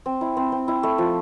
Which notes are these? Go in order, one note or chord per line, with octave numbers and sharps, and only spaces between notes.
C4
E4
C4
C4
E4
A3
F3